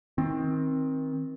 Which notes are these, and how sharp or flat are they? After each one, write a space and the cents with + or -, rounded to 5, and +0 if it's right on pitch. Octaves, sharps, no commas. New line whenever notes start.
D#3 +30 C4 +20